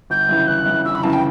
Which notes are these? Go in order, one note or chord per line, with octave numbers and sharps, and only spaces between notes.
G1 G6
F#2 C#3 E3
G1 F#6
F#2 C#3 E3
G1 E6
B5
F#2 C#3 E3 A5
G5